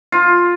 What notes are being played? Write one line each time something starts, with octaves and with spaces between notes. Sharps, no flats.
F4